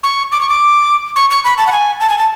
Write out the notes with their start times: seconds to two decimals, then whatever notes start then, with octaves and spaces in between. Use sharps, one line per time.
0.03 C#6
0.32 D6
0.41 C#6
0.49 D6
1.16 C#6
1.30 C#6
1.44 B5
1.58 A5
1.67 F#5
1.72 G#5
2.00 A5
2.09 G#5
2.18 A5